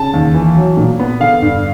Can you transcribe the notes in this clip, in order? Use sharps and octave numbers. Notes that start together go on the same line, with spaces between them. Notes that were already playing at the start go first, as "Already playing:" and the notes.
Already playing: C#3 A5
D#2
E3
F#3
A#2
B3
D3 F5
G2